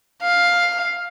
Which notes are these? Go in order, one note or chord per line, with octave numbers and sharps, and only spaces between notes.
F5